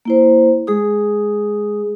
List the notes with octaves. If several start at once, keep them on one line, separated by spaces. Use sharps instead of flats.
A#3 E4 C5
G#3 G#4 D#6